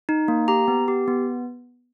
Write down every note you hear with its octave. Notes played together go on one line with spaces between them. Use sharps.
D#4
A#3
G4 A#5
B3
G4
B3